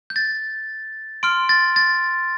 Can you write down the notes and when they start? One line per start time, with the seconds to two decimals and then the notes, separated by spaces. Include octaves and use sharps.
0.10 G6
0.16 A6
1.23 C6 F6 D7
1.49 A6
1.76 A6